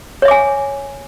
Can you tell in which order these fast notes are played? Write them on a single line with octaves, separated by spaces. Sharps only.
C#5 E5 D6 G#5